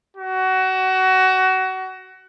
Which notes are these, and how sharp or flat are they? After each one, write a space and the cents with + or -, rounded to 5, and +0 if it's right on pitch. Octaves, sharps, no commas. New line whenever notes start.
F#4 +25